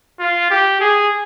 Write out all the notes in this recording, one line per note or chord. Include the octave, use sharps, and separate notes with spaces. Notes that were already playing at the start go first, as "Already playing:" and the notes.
F4
G4
G#4